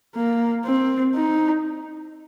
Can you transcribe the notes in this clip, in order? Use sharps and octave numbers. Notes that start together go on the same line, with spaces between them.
A#3
C4
D#4